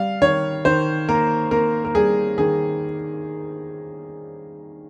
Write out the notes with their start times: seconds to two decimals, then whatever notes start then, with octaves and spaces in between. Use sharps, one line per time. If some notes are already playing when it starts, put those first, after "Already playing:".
Already playing: G3 F5
0.22 D#3 C#5
0.65 D#3 C5
1.09 A#3 A#4
1.51 A#3 A#4
1.85 A#4
1.95 G3 G#4
2.38 D#3 G#4